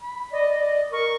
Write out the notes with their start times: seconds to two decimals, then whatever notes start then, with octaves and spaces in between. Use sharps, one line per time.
0.02 B5
0.32 D5 D#5
0.92 A#4 C#6